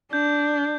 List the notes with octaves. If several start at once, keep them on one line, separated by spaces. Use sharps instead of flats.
D4 G6